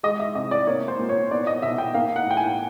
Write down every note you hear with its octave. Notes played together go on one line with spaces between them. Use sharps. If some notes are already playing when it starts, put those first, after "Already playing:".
G#3 D#5
E5
C3 D#5
D5
A#3 C#5
C5
A#2
C#5
B3 D5
D#5
B2 E5
G5
A#3 F5
F#5
A2 G5
G#5